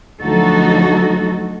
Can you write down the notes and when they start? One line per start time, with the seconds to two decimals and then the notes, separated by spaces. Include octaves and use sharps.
0.21 D2 F3 F#3 D#4 F#4 A4